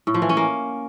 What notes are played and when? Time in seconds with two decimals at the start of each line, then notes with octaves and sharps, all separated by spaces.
0.07 A2
0.14 F3
0.22 E3
0.29 C#4
0.37 A#3